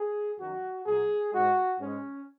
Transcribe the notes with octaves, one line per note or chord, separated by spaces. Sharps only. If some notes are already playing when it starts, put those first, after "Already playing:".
Already playing: G#4
F#2 D#3 F#3 F#4
A#2 F#3 G#4
G#2 G#3 F#4
G#2 G#3 C#4